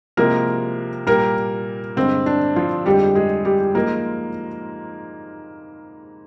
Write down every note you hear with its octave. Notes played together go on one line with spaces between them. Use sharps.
C3 F3 G#3 A#3 A#4
A#2 G3 A#3 A#4
G2 D3 G#3 C4
D4
F3 F4
F2 D3 G3 G#3 G4
G#3 G#4
G3 G4
G#2 F3 G#3 A#3 A#4